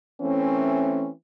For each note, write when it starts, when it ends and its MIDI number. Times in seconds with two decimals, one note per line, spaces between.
0.21 1.08 52
0.21 1.08 57
0.21 1.08 60
0.21 1.08 61